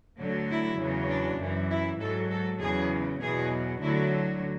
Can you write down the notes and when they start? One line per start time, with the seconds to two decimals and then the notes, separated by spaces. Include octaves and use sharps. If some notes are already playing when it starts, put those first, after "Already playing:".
0.20 D2 D3 F#3
0.50 E4
0.79 E2 C#3 F#3
1.09 D4
1.40 F#2 E3
1.71 E4
2.00 G#2 F#3 A4
2.31 A4
2.61 E2 C#3 F#3 G#4
3.21 E2 B2 F#3 G#4
3.82 D2 D3 F#3 E4